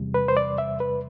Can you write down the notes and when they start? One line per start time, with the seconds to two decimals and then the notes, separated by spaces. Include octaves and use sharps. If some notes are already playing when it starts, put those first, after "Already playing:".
Already playing: E2 C3 G3
0.14 B4
0.28 C5
0.37 D5
0.58 E5
0.80 B4